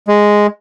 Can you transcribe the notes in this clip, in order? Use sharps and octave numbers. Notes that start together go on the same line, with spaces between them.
G#3